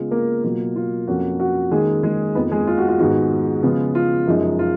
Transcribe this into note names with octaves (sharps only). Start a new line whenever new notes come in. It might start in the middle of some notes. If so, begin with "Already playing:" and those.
Already playing: C#3 G#3 B3 F4
A#3 A#4
B2 F#3 A#3 F4
F4
F2 F3 A#3 C#4 F4 F#4
F#4
D#3 G#3 A#3 C#4 G#4
G#3 G#4
F2 F3 A#3 B3 D#4 B4
G#3 G#4
F4
F#4
F4
G#2 D#3 G#3 B3 F#4
C#3 F3 G#3 B3 F4
F4
F#2 F3 G#3 D#4
F4